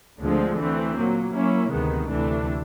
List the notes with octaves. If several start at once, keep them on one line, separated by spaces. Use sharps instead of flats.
D2 D3 F3 G#3 C4
E3 A3 C4
A#2 F#3 A#3
F#3 A#3 C#4 E4
D2 C3 D#3 G#3 B3
D2 C3 E3 A3 D4